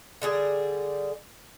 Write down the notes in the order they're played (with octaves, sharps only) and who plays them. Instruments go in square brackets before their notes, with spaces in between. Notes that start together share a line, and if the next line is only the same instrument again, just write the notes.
[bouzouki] D3 G3 G#4